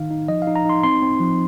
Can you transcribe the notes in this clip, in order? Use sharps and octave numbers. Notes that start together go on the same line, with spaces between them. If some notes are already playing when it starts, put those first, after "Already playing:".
Already playing: D#3 D#4 F5
D#4
F3 D#5
F5
D#4
A#5
D#4 C6
C4 C6
C4
F3